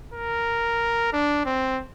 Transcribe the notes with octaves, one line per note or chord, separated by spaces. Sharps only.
A#4
D4
C4